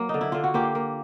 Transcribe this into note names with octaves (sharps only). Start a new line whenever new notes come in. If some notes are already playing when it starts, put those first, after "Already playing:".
Already playing: F#3 A#3
D3 D#4
E4
D3 F4
F#4
A#3 F4 G4
A#3